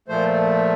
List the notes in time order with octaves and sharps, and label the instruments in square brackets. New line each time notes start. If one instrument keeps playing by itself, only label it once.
[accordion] A#2 F3 A3 C5